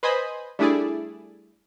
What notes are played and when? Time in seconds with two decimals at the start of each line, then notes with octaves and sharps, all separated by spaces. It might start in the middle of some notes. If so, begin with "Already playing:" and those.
0.03 B4 C5 D#5 G#5 B5 D#6
0.59 G3 A3 D4 E4 G#4 D5